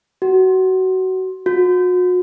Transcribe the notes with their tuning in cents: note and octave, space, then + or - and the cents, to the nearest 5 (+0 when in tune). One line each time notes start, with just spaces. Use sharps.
F#4 +20
F#4 -35